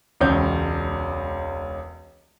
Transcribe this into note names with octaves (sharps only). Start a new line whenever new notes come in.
E1 C#2 C#4 G6